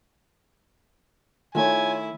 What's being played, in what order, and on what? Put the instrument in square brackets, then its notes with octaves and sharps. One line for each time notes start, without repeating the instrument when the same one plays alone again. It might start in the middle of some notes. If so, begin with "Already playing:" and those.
[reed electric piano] D#3 A3 [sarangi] E4 [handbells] F4 C#5 [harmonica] G#5